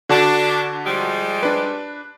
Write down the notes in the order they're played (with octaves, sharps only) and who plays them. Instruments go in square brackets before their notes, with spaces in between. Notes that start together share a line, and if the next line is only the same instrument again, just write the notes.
[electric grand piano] D3 F#4 A5 [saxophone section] D4
[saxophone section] F3 G3 G#3
[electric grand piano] D4 B4